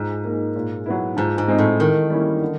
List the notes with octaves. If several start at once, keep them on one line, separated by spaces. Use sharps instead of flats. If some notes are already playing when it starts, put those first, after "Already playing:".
Already playing: G#2 F3
A#3 D#4
A#2
F#3 B3 E4
G#2 F3
G#2
G#3 C4 D#4
A2
D#3 E3
G3 A#3 C#4 E4
D3